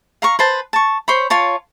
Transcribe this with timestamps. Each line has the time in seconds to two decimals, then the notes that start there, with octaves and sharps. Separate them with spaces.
0.22 F5 A#5 C#6
0.39 B4 C5 A5
0.73 A5 C#6
1.08 C5 C#5 B5
1.30 F4 C#5 A5